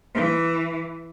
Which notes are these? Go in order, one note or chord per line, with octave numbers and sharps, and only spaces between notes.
E3